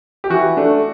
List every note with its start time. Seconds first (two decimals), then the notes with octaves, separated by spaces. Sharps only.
0.24 G4
0.30 E3 F#4
0.57 A3 D4